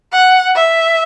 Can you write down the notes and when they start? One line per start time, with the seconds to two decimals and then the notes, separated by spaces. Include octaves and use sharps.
0.12 F#5
0.56 E5